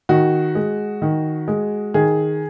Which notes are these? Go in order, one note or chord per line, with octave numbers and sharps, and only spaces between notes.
D#3 F#4
G#3
D#3
G#3
D#3 G#4